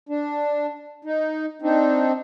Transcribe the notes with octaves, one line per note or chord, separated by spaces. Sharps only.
D4
D#4
C4 D4 D#4